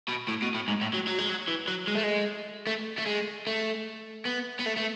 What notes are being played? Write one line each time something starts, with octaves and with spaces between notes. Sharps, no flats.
B2
A2
B2
A2
G#2
A2
F#3
F#3
G#3
F#3
E3
F#3
G#3
A3
G#3
A3
A3
G#3
A3
B3
B3
A3
A3